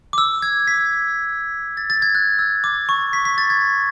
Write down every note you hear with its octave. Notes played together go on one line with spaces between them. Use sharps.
D6
E6
G#6
B6
A6
A6
G#6
F#6
E6
D6
C#6
B6
B6
A6
G#6